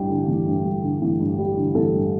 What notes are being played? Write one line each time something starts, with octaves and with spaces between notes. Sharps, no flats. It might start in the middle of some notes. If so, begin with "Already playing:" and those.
Already playing: A1 G2 G3 G4
D3
A1
G2
G3
D3
A1
G2
G3
D3
A1 A4
G2